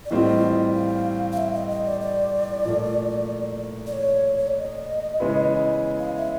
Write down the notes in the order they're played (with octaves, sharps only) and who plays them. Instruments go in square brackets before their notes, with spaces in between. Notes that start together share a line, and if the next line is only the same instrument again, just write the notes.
[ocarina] D5
[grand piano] A2 E3 G3 C4 F4 [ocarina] D#5
[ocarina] F5
F5
E5
D#5
D#5
D5
D5
[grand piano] A#2 F3 A3
[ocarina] D5
C#5
C#5
D5
D#5
[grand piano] C#3 E3 G#3 B3 E4
[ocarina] F5
E5